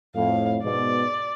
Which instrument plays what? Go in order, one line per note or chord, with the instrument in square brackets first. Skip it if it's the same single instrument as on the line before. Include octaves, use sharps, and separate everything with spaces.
[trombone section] F2 A2 [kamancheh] F5
[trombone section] G#2 B2 [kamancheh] D5